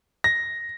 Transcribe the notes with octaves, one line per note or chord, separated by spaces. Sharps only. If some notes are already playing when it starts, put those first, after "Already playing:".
A#6